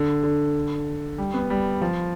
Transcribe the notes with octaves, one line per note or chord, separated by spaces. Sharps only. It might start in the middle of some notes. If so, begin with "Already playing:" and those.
Already playing: D3
D3
G3
B3
G3
F3